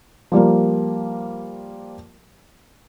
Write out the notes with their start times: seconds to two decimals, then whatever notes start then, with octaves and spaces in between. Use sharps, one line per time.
0.32 F3 G3 A#3 A#4